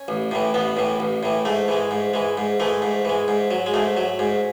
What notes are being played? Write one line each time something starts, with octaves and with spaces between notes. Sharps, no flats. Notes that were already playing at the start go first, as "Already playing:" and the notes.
Already playing: C#4
A1
A2 E3
A1 B3
A2 E3
A1
A2 E3
G#2 A3
E3 G#3
G#2
E3 G#3
G#2
E3 G#3 A3
G#2
E3 G#3
G#2
F#3
G#3
G#2 A3
F#3
G#2